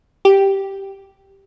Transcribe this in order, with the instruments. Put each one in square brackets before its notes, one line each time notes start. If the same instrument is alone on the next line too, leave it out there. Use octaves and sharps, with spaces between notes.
[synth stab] G4